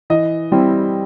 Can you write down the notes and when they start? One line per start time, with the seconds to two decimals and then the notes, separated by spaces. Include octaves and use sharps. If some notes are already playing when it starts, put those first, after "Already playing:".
0.10 E3 D#5
0.52 G3 C4 E4